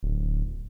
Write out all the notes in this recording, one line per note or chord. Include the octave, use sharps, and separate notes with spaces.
D1